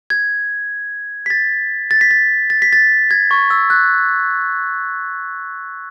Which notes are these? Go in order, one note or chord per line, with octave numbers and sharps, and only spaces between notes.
G#6
B6
A6
A6
B6
A6
A6
B6
A6
G#6
C#6
E6
F#6